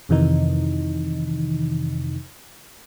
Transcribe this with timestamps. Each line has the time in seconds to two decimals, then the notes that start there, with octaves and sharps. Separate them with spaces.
0.09 F2 C3 D#3 E3 D#4